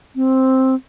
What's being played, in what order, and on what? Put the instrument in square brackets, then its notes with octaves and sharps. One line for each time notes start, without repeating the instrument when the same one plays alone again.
[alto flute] C4